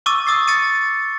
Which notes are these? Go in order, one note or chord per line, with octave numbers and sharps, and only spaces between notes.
C#6 D6 E6 A6 D#7
D6 D#6 A6 C7
A6 C#7 D#7